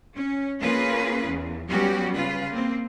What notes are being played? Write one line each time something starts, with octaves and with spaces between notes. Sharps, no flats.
C#4
A#3 C#4 F4 G#4 A#4 B4
E2
F#3 G3 B3 C#4 F#4 G4
C#3 F4 B4
A#3 C4